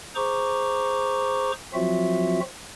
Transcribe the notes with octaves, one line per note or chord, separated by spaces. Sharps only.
G#4 C5 A#5 C#6 D6
F3 F#3 C4 F4 F#4 E5